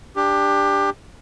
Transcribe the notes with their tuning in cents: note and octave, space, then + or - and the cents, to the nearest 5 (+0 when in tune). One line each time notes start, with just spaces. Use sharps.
D4 +0 G4 +20